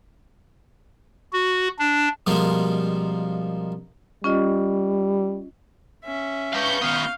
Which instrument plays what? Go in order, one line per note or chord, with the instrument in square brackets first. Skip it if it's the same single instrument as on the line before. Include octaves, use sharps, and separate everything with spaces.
[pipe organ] F#4
D4
[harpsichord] B2 F3 G3 G#3 A#3 C4
[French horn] G3 [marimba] C#4 F4 D#5
[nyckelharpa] C#4 E5
[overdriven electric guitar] B4 F5 [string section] C#6 G6
[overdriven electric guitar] D#3 B3 [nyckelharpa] F5